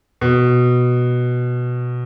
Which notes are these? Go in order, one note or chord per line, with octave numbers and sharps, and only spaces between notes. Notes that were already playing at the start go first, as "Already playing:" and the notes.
B2